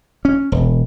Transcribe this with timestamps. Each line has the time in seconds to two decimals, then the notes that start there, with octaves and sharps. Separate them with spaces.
0.25 C#4
0.52 E1